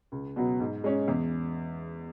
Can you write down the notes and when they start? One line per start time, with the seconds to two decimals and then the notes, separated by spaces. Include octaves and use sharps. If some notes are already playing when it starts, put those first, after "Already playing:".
0.12 C#2
0.36 B2 F#3 B3
0.60 G#2
0.84 G#3 C#4
1.08 E2